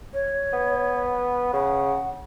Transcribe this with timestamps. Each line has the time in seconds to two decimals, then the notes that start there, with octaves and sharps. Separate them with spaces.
0.14 C#5
0.53 B3
1.53 C#3 F#5